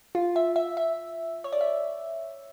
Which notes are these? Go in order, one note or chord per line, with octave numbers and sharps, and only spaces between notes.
F4
E5
E5
E5
C#5
D5
E5